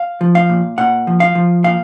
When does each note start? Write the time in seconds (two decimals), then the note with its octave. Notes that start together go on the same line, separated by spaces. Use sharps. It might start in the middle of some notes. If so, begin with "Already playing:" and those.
Already playing: F5
0.21 F3
0.35 F5
0.49 A#2
0.78 A#2 F#5
1.07 F3
1.20 F5
1.35 F3
1.64 A#2 F5